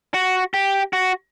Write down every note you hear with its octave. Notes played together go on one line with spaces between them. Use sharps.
F#4
G4
F#4